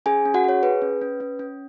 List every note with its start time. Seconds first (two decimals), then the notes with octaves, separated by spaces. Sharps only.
0.06 C#4 G#4 G#5
0.26 C#4
0.34 F#4 F#5
0.44 G#4 C#5
0.63 G#4 B4
0.82 C#4
1.01 C#4
1.20 C#4
1.39 C#4